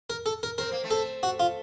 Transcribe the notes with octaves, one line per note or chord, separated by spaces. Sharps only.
A#4
A4
A#4
C4 A#4
A#3
A3 C4
A4
F#4
F4